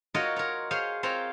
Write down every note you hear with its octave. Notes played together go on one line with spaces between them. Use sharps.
F4 F#4 A#4 C#5 D#5
A#4 C#5
G#4 C5 C#5 F5 C6
C4 F4 C5 C#5 F5 A#5